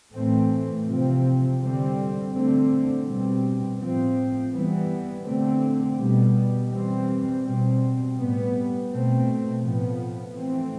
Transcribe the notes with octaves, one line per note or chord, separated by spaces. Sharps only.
A2 E3 A3 C4
C3 F3 C4
D3 G3 C4
D3 A3 C4
B2 G3 C4
A2 F3 C4
E3 G3 B3
D3 A3 C4
B2 G3 B3
E3 G3 C4
B2 G3 C4
A2 G3 B3
B2 A3 C4
A2 F3 B3
E3 A3 C4